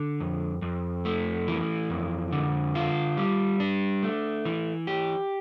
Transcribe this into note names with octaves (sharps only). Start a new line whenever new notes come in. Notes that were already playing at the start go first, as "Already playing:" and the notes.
Already playing: D3
F2
F2
A3
E3
F2
D3
F4
G3
D4
A3
E3
G4